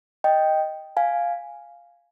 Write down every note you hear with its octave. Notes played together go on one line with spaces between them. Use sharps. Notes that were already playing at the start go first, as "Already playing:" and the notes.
D#5 G5
F5 G#5